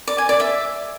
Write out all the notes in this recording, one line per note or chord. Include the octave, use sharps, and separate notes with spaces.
D5
G#5
D5
E5